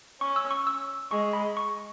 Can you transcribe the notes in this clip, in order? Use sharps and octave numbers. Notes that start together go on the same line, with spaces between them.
C#4 C#6
E6
C#6
E6
G#3 C#6
B5
C#6